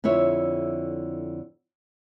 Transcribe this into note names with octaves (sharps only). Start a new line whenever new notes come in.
F2 D3 E4 C#5 E5